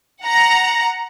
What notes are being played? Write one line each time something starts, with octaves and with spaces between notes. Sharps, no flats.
F#5 A#5